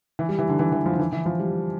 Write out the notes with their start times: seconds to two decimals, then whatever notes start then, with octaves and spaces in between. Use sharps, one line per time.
0.19 E3
0.29 G3
0.39 E3
0.49 D3
0.59 E3
0.72 E3
0.86 F3
0.94 D3
0.99 E3
1.13 E3
1.26 F3
1.40 G3